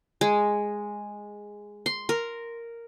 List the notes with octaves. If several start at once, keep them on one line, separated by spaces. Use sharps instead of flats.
G#3
C6
A#4